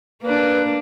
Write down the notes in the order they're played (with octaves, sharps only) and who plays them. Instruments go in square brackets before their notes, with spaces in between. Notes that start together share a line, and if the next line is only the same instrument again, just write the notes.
[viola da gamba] A#3 D4 [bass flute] B4